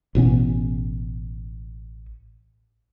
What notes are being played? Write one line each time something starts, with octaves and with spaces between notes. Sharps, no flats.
A1 B2 B3 C#4